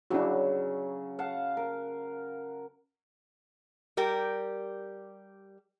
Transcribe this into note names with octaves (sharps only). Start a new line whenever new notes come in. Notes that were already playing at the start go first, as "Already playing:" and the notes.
C#3 F#3 D4 E4 F#4
F5 F#5 A5
A#4
G3 G4 A#4